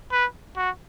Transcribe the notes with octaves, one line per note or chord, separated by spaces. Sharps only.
B4
F#4